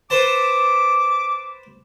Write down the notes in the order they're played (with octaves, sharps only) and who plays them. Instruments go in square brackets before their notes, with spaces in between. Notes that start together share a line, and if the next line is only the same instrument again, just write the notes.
[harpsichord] B4 C5 A5 [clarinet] D6